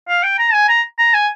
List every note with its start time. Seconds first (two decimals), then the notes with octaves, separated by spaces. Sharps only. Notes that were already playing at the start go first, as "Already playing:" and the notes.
0.08 F5
0.23 G5
0.39 A#5
0.53 G#5
0.68 A#5
0.98 A#5
1.14 G#5